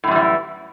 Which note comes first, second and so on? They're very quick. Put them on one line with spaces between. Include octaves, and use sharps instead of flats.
A2 F#2 G3 E3